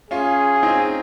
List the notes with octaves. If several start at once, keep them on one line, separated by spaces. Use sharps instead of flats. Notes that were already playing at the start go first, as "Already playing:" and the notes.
C#4 F4 G#4
F4
C4 D#4